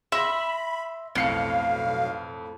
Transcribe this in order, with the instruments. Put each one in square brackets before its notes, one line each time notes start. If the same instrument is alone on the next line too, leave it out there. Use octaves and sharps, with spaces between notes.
[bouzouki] E5 [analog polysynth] B5 [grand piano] C6 A#6
[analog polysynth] B1 F5 [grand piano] F2 C7 C#7 [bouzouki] A2